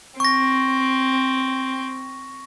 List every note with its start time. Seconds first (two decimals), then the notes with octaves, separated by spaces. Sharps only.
0.20 C4 C#6 A#6